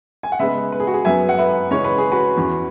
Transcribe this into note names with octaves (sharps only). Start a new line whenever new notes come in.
G#5
F#5
C#3 G#3 B3 B4 E5
B4
G#4
F#4
G#4
F#2 F#3 B3 E5 G#5
F#5
B4 E5
C#3 E3 G#3 C#4 C#5
B4
G#4
F#4 B4
E2 E3 C#4